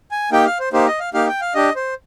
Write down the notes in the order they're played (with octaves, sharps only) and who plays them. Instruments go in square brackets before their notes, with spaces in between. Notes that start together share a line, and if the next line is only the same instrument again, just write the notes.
[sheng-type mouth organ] G#5
A#3 D#4 G4 G5
F5
C5
A#3 D#4 G4 C5
D#5
F5
A#3 D#4 G4 F5
G5
F5
D4 G4 D#5
C5